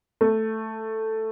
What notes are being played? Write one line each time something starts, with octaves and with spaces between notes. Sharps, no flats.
A3